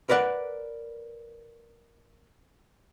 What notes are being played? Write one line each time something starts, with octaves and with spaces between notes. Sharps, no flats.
A#4 B4 D5 F#5